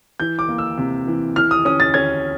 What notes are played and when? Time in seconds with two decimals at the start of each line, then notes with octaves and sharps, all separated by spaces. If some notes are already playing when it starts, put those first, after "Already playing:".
0.20 E3 G6
0.39 D6
0.49 A#3
0.58 E6
0.78 C3
1.07 E3
1.36 E3 F6
1.51 D#6
1.65 C#4 D#6
1.80 A6
1.94 C#4 G#6